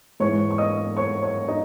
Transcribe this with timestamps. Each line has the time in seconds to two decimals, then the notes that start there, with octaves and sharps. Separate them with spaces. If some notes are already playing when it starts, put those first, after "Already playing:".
0.20 G#2 E3 G#3 C#5 C#6
0.50 C#6
0.58 D#5 D#6
0.97 C#5 C#6
1.22 C#5 C#6
1.48 D#4 D#5